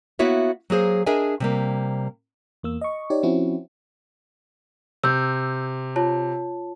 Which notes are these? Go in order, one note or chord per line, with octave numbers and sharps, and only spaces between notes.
A#3 B3 E4 F#4 C#5 E5
F#3 A#3 G#4 C5
D4 G#4 A#4 D#5 E5 G#5
C3 G3 A#3
E2 A#3 E6
D#5 C#6
D#4 G4 C#5 D5
F3 C4 C#4 E4 F#4
C3 E6 G6
F4 C#5 A5